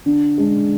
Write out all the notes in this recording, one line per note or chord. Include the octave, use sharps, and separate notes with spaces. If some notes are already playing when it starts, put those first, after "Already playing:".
D3
G#3 D4